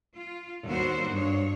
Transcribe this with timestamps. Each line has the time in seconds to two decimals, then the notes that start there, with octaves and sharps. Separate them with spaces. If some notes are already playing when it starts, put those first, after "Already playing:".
0.16 F4
0.66 D#2 G3 B3 F#4 A#4 C5
1.10 G2 C#5